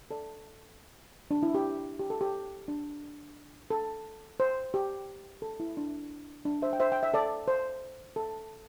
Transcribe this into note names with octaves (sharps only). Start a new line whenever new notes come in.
A4 D5
D4
E4
G4
G4
A4
G4
D4
A4
C5
G4
A4
E4
D4
D4
C5 E5
G5
C5 E5
G5
E5
A4 D5
C5
A4